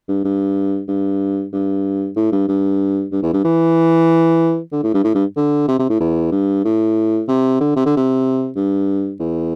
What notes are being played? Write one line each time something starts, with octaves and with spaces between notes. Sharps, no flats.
G2
G2
G2
G2
A2
G2
G2
G2
E2
G2
E3
D3
A2
G2
A2
G2
D3
C3
C3
A2
E2
G2
A2
C3
D3
C3
D3
C3
G2
E2